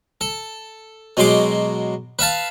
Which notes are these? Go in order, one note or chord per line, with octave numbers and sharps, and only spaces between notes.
A4
B2 F#3 G#3 C6 D6
B4 E5 F5 A5